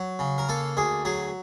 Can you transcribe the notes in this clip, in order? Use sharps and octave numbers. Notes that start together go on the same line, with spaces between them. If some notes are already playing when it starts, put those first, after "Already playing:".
Already playing: F#3
C#3
A#4
A#3 A4
D2 G#4
F#3 G#4